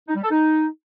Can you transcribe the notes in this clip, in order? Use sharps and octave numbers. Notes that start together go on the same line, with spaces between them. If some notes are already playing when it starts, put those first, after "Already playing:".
D#4
G3
A4
D#4